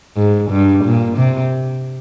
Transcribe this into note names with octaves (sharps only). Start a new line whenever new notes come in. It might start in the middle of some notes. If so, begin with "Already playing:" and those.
G#2
G2
A#2
C3